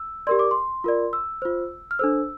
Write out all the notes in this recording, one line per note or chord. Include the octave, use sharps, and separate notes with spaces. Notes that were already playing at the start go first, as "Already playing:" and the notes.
Already playing: E6
G4 A#4 D5 C6
D6
C6
F4 A#4 D5
E6
F4 C5
F6
D4 A4 C5 E6